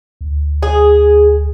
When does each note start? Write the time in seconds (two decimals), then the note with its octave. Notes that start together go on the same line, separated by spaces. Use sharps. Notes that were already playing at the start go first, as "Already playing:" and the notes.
0.21 D2
0.63 G#4